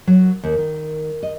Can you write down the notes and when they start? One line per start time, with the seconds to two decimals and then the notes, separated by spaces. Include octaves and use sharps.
0.07 F#3
0.43 D#2
0.58 D#3
1.23 D#5